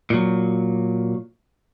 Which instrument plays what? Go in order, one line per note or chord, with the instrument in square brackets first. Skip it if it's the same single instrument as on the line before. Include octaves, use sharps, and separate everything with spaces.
[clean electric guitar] A#2 F#3